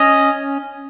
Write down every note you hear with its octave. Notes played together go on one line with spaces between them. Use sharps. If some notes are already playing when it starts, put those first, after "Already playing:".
Already playing: C#4 D#5